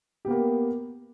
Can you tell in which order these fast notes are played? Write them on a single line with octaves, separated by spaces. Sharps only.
G4 B3 A#3